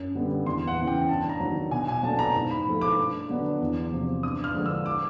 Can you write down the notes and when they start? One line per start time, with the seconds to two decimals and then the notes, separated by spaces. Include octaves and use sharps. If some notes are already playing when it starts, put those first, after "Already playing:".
Already playing: F#2
0.15 D3 G3 B3
0.46 E2 C6
0.67 F#5
0.77 C#3 E3
0.87 G5
1.09 G2 A5
1.29 A#5
1.40 D#3 F#3
1.71 B2 G#5
1.88 G#5
2.03 F#3 A3 D4 A5
2.19 A#5
2.35 G#2
2.51 B5
2.66 F3 A3
2.81 D6
2.97 G2
3.29 D3 F#3 B3 D4
3.61 E2
3.92 C3 F3
4.23 G2 D#6
4.44 F6
4.54 D3 F3 G#3
4.66 E6
4.86 D6